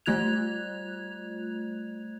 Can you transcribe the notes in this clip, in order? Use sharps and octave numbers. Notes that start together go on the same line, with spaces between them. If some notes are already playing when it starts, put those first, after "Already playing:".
G3 A3 F4 F#6 G#6 F7